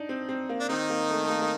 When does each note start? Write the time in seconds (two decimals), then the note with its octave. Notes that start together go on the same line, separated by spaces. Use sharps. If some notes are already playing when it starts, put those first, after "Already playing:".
Already playing: D4 D#4
0.09 C4
0.29 C4
0.49 A#3
0.60 D4
0.69 D#3 C4 D#4
0.90 A#3
1.10 A3
1.24 A3
1.30 A#3
1.42 A#3